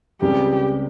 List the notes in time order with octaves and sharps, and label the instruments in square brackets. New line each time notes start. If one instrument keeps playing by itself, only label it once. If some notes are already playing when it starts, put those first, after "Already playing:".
[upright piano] C#2 C#3 G3 C4 [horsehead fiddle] G4